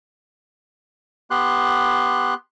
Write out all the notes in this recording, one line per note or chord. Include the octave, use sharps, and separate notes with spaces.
B3 G4 C6 F#6